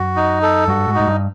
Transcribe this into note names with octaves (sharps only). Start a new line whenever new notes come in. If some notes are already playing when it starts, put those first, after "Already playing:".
Already playing: F#2 F#4
D#4
A4
G2 F#4
G#2
D#4
G#2
G2